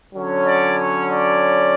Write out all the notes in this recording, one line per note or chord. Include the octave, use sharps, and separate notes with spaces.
D3 F#3 C#4
D5
C#5
D5